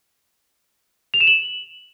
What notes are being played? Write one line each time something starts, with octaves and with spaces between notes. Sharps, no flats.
F7
E7
F#7